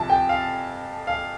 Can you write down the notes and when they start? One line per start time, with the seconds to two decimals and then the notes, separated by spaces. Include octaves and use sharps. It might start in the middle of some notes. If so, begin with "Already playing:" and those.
Already playing: F2 C3 F3 A5
0.10 G5
0.29 F5
1.07 F5